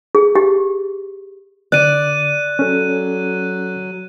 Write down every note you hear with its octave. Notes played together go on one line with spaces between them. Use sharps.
G#4
G4
D3 D5 F#6 D#7
F#3 C#4 A4